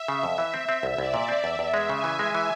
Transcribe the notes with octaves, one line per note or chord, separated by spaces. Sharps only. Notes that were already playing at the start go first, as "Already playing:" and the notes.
Already playing: E5
C#3
F2
E3
C4 E5
C4
C2
C2 D5
A#2
C4
E2 E5
E2
G#3
C#3 G#5
E3
G#3
E3